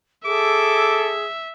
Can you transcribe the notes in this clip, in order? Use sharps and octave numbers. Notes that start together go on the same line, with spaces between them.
G#4 A4 E5 D6